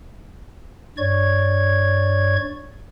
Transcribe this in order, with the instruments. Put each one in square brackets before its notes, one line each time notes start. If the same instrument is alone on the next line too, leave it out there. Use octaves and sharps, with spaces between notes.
[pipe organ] G2 C#5 D5 C#6 G#6